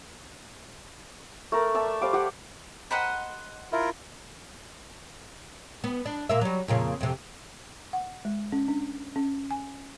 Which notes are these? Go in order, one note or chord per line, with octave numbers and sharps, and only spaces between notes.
A3 A#4
D5 E5 A5
G3 C5 F5 D6
G4 F5 F#5
G4 A#4 C5 D#5 F#5 B5
E4 F4 A#4 E5
B3
D4
A#2 A#3 E5
F#3 G3
F2 A#2 C#3
F2 C3
F#5
G#3
C#4
D4
C#4
G#5